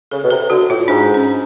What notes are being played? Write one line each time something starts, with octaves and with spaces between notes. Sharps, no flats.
C#3 A4
B2
C3 A4
D3 F#4
A2 F4
G#2 D4
C#4